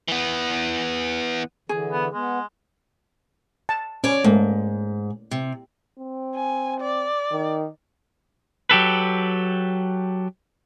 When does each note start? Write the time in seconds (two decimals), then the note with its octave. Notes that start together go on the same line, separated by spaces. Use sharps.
0.08 E3 B3
1.69 D3 E3 G#4
1.92 B3
2.14 G#3 B3
3.69 A5
4.04 C#4 C#5 D5
4.24 G#2 A3 A#3
5.31 C3
5.99 C4
6.36 G#5
6.80 D5
7.31 D#3
8.69 F#3 G4 A4 B4